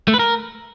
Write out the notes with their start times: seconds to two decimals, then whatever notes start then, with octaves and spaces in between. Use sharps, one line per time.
0.08 A3
0.14 B4
0.19 A#4